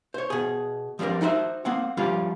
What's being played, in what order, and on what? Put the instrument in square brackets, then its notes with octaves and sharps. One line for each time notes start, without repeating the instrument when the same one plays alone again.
[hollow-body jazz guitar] C5 C#5
B2 G#4
F3 G3 C4 D4 A#4
D#4 E4 F#4 C5 E5
A#3 C4 F#5
F3 G3 C#4 D4 F4